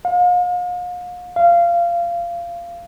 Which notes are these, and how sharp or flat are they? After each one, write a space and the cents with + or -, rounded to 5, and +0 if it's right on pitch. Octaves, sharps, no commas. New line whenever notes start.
F5 +40
F5 -20